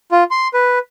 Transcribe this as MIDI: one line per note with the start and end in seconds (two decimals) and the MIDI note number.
0.12 0.24 65
0.31 0.48 84
0.54 0.79 71